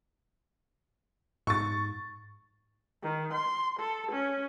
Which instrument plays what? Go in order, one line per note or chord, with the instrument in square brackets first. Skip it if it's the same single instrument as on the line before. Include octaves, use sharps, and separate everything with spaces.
[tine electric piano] G#2 [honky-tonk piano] C#6 A6
[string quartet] D#3
C6
A4
C#4